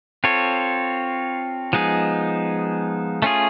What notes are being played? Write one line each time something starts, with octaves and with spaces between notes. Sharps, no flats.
C4 F4 A4 C#5
F3 G#3 B3 D#4 G#4
A3 C#4 F4 G#4